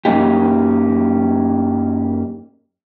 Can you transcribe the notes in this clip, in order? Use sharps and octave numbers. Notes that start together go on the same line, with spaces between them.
F#2 A#3 C#4 D#4 G4